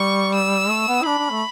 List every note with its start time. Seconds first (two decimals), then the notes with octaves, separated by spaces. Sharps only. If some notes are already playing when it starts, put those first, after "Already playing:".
Already playing: G3 C#6
0.35 E6
0.70 A3
0.88 B3
1.02 E4
1.05 D4 B5
1.18 D4
1.30 A3